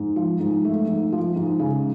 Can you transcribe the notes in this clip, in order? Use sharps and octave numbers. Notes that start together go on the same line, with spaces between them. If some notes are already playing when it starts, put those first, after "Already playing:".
Already playing: G#2
F3
G#2
A3
G#2
F3
G#2
C#3